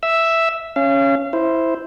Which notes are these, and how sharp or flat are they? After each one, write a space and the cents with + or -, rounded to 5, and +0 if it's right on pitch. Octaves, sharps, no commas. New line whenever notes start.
E5 +0 E6 +0
C#4 +0 F5 -35
E4 -5 C5 +0